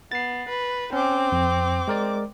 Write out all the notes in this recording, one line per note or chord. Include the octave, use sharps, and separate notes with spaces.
B3 A6 C7
B4
C4 C#4 D6
F2
G#3 A#4 D5